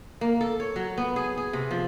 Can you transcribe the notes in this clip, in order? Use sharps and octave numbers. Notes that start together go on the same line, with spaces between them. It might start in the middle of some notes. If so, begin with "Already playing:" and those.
A#3
A4
C#5
F#3
B3
G#4
G#4
C3
F3